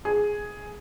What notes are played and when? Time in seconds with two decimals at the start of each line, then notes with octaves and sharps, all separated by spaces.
0.05 G#4